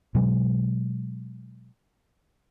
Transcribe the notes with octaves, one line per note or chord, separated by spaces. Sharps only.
B2 F#3 G#3